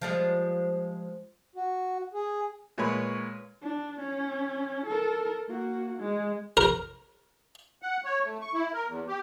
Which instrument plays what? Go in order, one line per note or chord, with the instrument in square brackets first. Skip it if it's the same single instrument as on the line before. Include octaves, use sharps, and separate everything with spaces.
[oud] F3 G3 G#3
[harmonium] F#4
G#4
[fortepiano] A#2 G#3 B4 C#5 B5
[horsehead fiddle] D4
C#4
A4 A#4
A#3 F#4
G#3
[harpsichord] A#4
[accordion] F#5
C#5
A3
C#6
E4
A#4
E2
G4